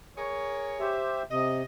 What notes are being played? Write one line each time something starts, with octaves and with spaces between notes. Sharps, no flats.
G#4 A#4 C#5
G4 C5 E5
C3 D#5